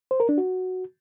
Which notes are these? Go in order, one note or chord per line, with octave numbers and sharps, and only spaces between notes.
C5
A#4
D4
F#4